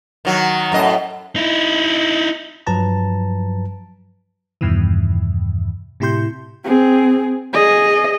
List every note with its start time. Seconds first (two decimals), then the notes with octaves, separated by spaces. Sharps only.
0.25 D#3 F#3
0.72 F#2 A2 D#5
1.36 D#4 E4
2.67 G2 F3 F#3 B4 A5 A#5
4.61 E2 G2 B2 D#3 E3
6.00 A2 C3 E4 G4 C6 G6
6.64 C4 G#4
7.54 G#4 D#5